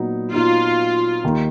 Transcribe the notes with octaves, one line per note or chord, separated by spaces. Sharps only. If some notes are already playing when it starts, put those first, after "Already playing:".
Already playing: A#2 F#3 B3 D#4
A#2 F#3 B3 D#4 F4
D#2 D#3 A#3 D#4